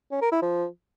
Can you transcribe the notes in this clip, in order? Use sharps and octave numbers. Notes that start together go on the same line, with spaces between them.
C#4
A#4
E4
F3